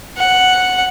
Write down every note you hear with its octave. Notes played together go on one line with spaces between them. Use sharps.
F#5